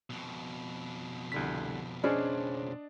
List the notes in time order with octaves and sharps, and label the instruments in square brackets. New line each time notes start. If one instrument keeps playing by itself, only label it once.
[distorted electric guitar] F2 B2
[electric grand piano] C2 D3 B6
[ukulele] C#4 G#4 C5 [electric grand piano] D4 D5 D#5